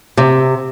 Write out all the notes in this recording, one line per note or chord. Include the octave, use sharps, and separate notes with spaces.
C3